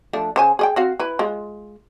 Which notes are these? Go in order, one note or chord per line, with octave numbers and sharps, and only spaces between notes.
F3 A3 D4
C#3 C5 G#5
G#4 D#5 G5
C4 F#4 F5
E4 B4
G#3 F4